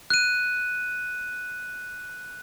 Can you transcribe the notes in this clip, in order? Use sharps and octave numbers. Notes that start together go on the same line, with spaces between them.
F#6 D#7